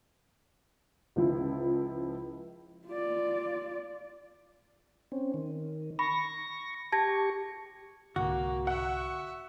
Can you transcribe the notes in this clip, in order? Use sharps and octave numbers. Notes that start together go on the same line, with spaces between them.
C#2 F3 E4
F4 D5
C4 C#4
D#3
B5 C#6 A#6
G4 A5 C#6 G#6 A#6
C2 G#2 D3 A#3 F#4
E5 F#5 C#6